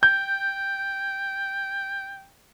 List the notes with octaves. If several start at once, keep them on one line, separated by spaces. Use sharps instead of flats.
G5 G6